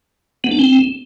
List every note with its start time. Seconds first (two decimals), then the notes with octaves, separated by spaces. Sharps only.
0.44 B3
0.51 D4
0.59 C4